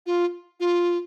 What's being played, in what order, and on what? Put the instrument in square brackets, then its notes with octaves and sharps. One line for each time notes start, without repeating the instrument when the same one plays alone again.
[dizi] F4
F4